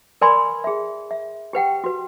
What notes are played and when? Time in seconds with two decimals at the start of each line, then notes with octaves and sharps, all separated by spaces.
0.21 A#4 B4 D5 G#5 B5 C6
0.64 G#4 E5
1.11 E5
1.53 G4 B4 F#5 G5
1.84 F#4 B4